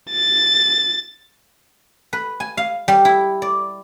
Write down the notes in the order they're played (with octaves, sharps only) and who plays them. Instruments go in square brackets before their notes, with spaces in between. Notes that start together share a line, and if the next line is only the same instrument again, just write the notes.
[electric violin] A6
[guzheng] B4
G#5
F5
G3
E4
D5